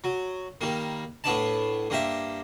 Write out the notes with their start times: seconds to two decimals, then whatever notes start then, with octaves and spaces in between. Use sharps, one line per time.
0.04 F#3
0.61 D#3 G3 A#3
1.24 A2 B3 D4 A5
1.90 G2 A#3 G4 E5